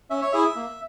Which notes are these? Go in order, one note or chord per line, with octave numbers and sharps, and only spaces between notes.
C#4 E5
C#5
E4 G#4 E5
A#3